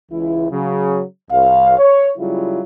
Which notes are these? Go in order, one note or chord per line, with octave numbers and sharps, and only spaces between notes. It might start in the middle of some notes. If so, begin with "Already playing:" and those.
C#2 E3 E4
C#3 F#3
C2 F5
C#5
C#3 F#3 G3 E4 F4